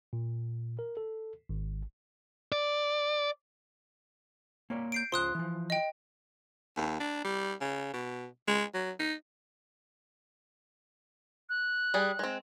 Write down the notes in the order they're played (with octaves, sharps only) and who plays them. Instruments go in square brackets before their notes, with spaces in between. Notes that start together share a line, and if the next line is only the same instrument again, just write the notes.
[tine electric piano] A#2
A#4
A4
G#1
[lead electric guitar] D5
[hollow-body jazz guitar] A#3 C#5 D5
[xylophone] G6 C7 D7
[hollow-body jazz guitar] C#2 F4 C5 [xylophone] C6 D#6 F#6
[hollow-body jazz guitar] E3 F3
[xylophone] D#5 G5
[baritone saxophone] D#2
D4
G3
C#3
B2
G#3
F#3
D#4
[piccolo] F#6
[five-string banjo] G3 G#4
G#3 C4